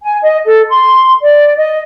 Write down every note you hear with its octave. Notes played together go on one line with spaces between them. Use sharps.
G#5
D#5
A4
C6
D5
D#5